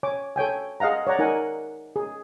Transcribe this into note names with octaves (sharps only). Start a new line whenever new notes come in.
C#5 G#5 D6
A4 C#5 G5 G#5
G#4 D#5 F5 F#5 A#5
C#5 D5 F#5 A#5
D#4 A#4 F#5 G#5
G#4